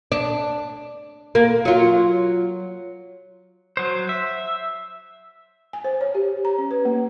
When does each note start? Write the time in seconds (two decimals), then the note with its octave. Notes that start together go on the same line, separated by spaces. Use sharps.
0.12 D4
1.35 A#3
1.65 F#3 F4
3.77 F#3 C5
4.09 E5
5.73 G#5
5.84 C5
6.01 C#5
6.15 G4
6.45 A#5
6.58 C#4
6.71 B4
6.85 A#3